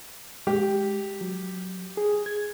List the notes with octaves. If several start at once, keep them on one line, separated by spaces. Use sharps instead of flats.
G#3 G4
F#3
G#4
G#6